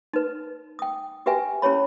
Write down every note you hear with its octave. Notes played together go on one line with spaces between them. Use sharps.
D#4 B4
G5 D#6
F#4 G4 B4 E5 G5 G#5
C#4 E4 G4 C#5 B5